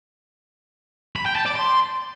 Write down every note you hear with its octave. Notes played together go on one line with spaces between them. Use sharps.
B5
G5
A5
D5
C6